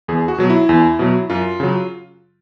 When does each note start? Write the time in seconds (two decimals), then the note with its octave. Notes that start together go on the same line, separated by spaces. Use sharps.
0.08 E2 G#4
0.28 F#4
0.38 B2 F#3
0.50 E4
0.69 E2
0.99 B2 F#3
1.30 F#2 F4
1.60 C#3 F#3